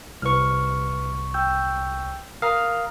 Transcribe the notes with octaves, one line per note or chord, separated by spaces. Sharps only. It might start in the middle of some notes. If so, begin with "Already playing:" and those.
C2 B4 C#6 F6
G5 E6 G6
A#4 F5 A#5 D#6 F6